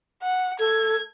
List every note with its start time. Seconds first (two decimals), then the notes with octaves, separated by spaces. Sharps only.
0.23 F#5
0.60 A4 G#6